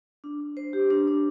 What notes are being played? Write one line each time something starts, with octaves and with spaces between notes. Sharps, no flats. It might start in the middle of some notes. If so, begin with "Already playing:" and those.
D4
D4
C5
G4
D4
D4